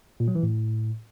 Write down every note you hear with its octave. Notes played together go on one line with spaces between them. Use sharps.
A#2
F#3
E3
A2